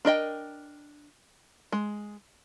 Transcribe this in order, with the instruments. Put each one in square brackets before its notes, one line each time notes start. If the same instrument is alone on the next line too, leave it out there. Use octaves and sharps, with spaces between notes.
[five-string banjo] D4 A#4 D#5 G5
G#3